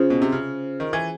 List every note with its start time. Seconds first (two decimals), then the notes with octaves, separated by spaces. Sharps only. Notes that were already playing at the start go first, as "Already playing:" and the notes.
Already playing: C#3 C#4 F4 G#4 C5
0.10 B2
0.22 C3
0.32 C#3
0.80 D#3
0.93 E3